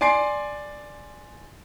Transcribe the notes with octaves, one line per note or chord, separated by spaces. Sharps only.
D5 G#5 C6 A6 C7 D7